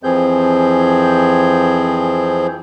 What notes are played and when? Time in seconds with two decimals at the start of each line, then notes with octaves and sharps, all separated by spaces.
0.03 F2 E3 F3 C4 G#4 G6